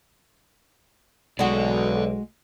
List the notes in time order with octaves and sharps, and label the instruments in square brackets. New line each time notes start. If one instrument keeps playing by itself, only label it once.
[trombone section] B1 [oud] G#3 F#4 [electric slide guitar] A4 D5